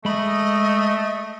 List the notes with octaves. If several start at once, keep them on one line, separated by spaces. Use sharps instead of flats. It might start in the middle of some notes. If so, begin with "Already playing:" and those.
G#3 A3 D#5 B5